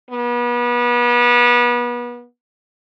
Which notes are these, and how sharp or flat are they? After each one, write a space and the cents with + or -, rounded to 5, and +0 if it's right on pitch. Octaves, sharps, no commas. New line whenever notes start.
B3 -30